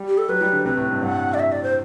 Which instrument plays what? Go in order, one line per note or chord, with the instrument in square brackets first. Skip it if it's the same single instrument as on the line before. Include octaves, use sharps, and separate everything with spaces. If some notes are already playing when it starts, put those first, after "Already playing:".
Already playing: [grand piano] G3
[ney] G4
A4
[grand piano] F#3 [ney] B4
[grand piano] G3
D3
[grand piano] C3 [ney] B4
[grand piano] A2
G2
[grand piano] G2 [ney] F#5
[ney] D5
E5
D5
C5